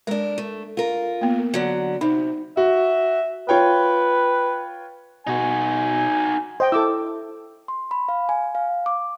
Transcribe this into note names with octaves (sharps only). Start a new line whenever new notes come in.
G#3 D4 A#4
A3
F4 A#4
A#3 B3
D3 F#3
C3 D#4
F#4 E5
F4 B4 C#5 G5
B2 D#4 F#4 G#5
C5 D#5 G5
E4 A4 D6 E6
C6
B5
F5
G#5
F5
D6